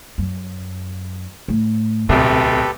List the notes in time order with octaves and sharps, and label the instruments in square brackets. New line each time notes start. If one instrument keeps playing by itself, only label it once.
[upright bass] F#2
A2
[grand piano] D1 C2 [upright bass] B2 [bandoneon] G4 A4 B4